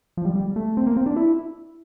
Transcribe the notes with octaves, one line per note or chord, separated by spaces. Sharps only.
F3
G3
G3
A3
C4
A#3
C4
D4
E4